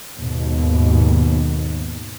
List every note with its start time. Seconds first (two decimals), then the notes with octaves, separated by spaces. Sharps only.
0.17 D#2 G#2 B2